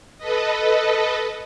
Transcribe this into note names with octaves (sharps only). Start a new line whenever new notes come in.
A4 B4 D#5